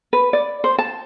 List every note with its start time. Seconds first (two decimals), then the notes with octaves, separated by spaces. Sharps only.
0.13 B4
0.33 D5
0.64 C5
0.78 A5